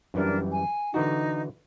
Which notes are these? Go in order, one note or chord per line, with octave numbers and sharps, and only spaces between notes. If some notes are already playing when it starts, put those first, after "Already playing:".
F#2 E3 G3 D4 A#4
G#5
D3 E3 D#4 F#4